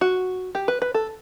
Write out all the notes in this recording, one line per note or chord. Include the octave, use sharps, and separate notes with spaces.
F#4
G4
B4
B4
A4